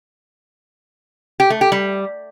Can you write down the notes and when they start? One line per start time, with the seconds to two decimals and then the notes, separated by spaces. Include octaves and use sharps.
1.40 G4
1.50 A3
1.61 G4
1.72 G3